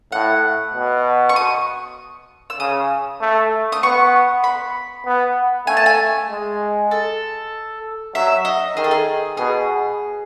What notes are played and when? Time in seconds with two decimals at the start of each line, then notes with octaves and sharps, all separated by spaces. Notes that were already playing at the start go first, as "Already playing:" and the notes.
0.12 A2 F#5
0.74 B2
1.29 C#6
1.36 D#6
2.50 E6
2.60 C#3 D#6
3.21 A3
3.72 D#6
3.83 B3 C#6
4.44 B5
5.06 B3
5.67 A3 G#5
5.77 A5
5.86 G#5
6.29 G#3
6.91 A4
8.15 F#3 E5
8.45 D#5
8.76 D#3 G#4
8.84 A4
8.91 G#4
9.37 B2 G#4